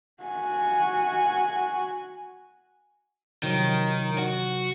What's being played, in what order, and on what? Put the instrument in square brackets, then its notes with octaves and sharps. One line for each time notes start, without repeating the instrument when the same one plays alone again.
[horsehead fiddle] F#4 G#5
[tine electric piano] C3 F3 F#3 [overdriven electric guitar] D#3
[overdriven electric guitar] F#4